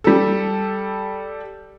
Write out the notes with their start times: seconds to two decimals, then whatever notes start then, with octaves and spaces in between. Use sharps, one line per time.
0.04 G3 A4